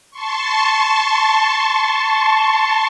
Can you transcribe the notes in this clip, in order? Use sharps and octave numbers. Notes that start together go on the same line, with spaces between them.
A5 C6 C#6